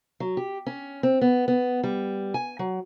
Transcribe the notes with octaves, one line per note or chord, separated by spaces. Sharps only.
F#3
G4
C#4
C4
B3
B3
G3
G#5
F#3